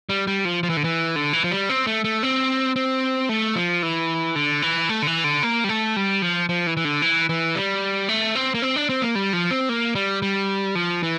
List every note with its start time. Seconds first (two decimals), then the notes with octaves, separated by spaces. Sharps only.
0.09 G3
0.27 G3
0.45 F3
0.63 F3
0.70 E3
0.77 D3
0.84 E3
1.16 D3
1.33 E3
1.44 F3
1.51 G3
1.69 C4
1.87 A3
2.04 A3
2.23 C4
2.76 C4
3.29 A3
3.56 F3
3.83 E3
4.36 D3
4.62 E3
4.89 A3
5.02 D3
5.07 E3
5.24 D3
5.43 A#3
5.64 G3
5.69 A3
5.96 G3
6.22 F3
6.49 F3
6.67 E3
6.77 E3
6.85 D3
7.02 E3
7.29 E3
7.55 G3
8.09 A3
8.35 C4
8.54 A#3
8.62 C4
8.76 D4
8.89 C4
9.02 A#3
9.15 G3
9.33 F3
9.51 C4
9.69 A#3
9.95 G3
10.22 G3
10.75 F3
11.03 E3